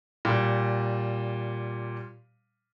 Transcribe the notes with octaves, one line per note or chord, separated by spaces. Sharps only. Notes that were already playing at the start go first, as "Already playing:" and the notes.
A#2 G3